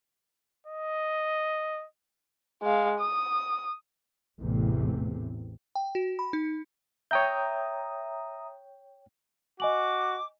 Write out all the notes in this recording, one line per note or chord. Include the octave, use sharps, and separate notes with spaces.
D#5
G#3 F5
D#6
A1 E2 A2 C3
G5
F#4
B5
D#4
C#5 E5 G5 A#5 D#6 G6
F#4 D#5 G#5 D6 F#7